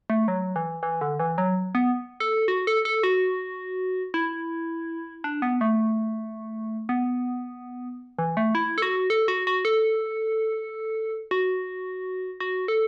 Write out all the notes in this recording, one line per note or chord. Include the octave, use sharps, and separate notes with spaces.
A3
F#3
E3
E3
D3
E3
F#3
B3
A4
F#4
A4
A4
F#4
E4
D4
B3
A3
B3
E3
A3
E4
A4
F#4
A4
F#4
F#4
A4
F#4
F#4
A4